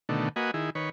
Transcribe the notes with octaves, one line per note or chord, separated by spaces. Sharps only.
B2 D3 D#3 A3
A#3 F#4 B4 D#5 G#5
D#3 E4 G#4
D#3 B4 C#5